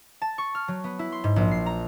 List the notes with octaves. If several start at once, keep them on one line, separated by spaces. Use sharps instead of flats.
A5
C#6
F6
F#3
B3
E4
C6
G#2
A#1
C7
A#5